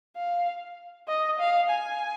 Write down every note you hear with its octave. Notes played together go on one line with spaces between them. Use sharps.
F5
D#5
F5
G#5